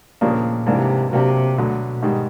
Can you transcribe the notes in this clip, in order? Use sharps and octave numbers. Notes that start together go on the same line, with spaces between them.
D#2 A#2 C#3 F3 A#3 D4
G#2 C3 E3 G3 A#3 D4
C3 F#3 A#3 D4 G4
D2 B2 D3 F#3
G#2 D#3 G3